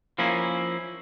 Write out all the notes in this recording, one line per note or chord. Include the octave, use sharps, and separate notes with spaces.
F3 A#3 C#4 E4